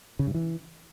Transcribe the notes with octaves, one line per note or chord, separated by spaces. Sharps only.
C#3
G2
E3